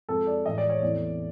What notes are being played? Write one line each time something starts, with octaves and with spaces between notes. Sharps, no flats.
F2 C3 F3 G#3 A4
D5
A2 E3 G#3 D#5
D5
C#5
E2 C3 E3 A3 D5